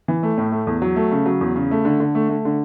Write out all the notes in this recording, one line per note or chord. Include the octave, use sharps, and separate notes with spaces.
E3
A3
A2
A3
E2
F#3
A3
C#3
F#3
E2
C#3
A3
D3
D3
A3
A3
D3